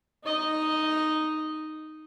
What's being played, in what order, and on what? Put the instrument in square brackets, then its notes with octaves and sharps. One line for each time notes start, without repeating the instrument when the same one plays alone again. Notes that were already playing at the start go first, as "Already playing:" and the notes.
[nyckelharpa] D#4 D#5